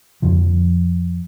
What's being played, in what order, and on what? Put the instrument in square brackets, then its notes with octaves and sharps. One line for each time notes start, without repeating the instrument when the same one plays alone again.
[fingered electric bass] F2 D3 F3